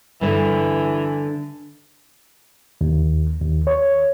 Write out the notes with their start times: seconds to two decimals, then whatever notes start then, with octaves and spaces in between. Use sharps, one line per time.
0.21 G2 D3 E3
2.81 D#2
3.41 D#2
3.67 C#5